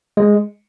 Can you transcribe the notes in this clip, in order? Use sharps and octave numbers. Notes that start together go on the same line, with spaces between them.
G#3